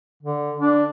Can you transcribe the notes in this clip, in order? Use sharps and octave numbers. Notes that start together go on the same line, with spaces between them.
D3
D4